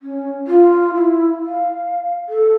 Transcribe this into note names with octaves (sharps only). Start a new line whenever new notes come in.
C#4
F4
E4
F5
A4